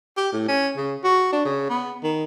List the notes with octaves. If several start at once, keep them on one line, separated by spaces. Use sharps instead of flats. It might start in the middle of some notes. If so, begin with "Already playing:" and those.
G4
A2
C#4
C#3
F#4
D4
C#3
B3
D#3